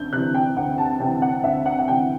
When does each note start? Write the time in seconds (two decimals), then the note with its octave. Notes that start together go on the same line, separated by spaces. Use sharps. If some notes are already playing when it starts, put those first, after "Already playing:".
Already playing: D2 G6
0.13 C3 E3 F#6
0.34 G5
0.56 D2 F#5
0.78 A5
1.00 C3 G5
1.05 E3
1.22 F#5
1.44 D2 E5
1.66 F#5
1.79 F#5
1.88 C3 E3 G5